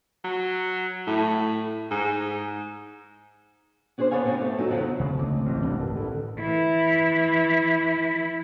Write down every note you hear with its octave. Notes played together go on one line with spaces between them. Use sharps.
F#3
A2
G#2
C#4 D4 G#4 A#4 C5
B3 D4 A4 C#5 F5 G#5
A2 C3 C4 C#4
A3 A4
D3 F#3 D#4 A4
E2 G2 C#3 F3 F#3
C#3 G#3 A3
D2 C4 D#5 D6
A1 A3 A#6
C2 G2 G3 C4 D4
A#4
D3 E3 A4
E3 E4